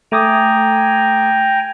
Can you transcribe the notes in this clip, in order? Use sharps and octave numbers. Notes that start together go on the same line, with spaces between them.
A3 G5 G#5 A#5 D6 D#6